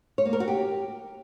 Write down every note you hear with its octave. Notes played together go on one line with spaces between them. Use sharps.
C#5
A#3
A#4
F#4
G4